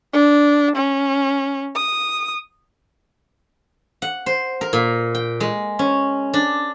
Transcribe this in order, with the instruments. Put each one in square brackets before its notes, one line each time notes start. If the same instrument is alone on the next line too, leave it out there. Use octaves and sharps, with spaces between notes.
[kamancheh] D4
C#4
D#6
[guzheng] F#5
C5
A#4
A#2
G5
G#3
C#4
D4